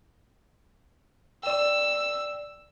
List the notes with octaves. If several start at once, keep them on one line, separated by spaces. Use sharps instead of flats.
D5 G5 E6